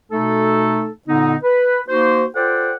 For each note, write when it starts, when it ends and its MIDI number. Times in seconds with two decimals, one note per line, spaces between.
0.12 0.90 47
0.12 0.90 57
0.12 0.90 63
0.12 0.90 69
1.08 1.37 46
1.08 1.37 50
1.08 1.37 59
1.08 1.37 63
1.43 1.80 71
1.88 2.26 58
1.88 2.26 63
1.88 2.26 66
1.88 2.26 72
2.35 2.74 65
2.35 2.74 69
2.35 2.74 72
2.35 2.74 74
2.35 2.74 78
2.35 2.74 79